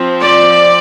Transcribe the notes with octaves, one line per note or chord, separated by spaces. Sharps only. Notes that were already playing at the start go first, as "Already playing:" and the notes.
Already playing: F3 C4
D5